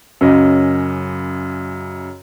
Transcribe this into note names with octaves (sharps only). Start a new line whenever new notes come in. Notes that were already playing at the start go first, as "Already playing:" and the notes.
F#2 C#3 C#4 D#5